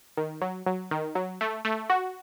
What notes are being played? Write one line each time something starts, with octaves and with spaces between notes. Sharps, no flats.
D#3
F#3
F#3
D#3
F#3
A3
A3
F#4